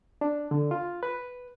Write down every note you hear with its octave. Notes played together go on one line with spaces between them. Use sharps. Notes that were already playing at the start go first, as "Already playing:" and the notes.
D4
D3
F4
B4